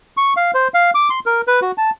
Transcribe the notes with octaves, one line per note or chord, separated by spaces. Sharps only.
C#6
F5
C5
F5
D6
C6
A#4
B4
F#4
A5